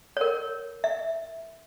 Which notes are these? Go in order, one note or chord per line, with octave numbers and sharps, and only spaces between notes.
A#4 C#5
E5